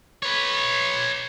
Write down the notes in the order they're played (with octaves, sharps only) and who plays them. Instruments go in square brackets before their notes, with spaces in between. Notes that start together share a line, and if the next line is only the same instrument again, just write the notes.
[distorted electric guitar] B4 C#5